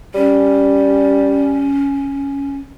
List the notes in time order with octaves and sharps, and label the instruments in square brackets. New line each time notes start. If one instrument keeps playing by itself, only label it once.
[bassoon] G3 [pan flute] C#4